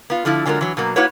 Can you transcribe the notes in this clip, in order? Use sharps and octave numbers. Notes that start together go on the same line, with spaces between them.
B3 F4
D3 F3 A3 E4
D3 F#3 G#3 F4 A#4
E3 F#3
B2 F#3 A#3
A#3 E4 F#4 B4 C#5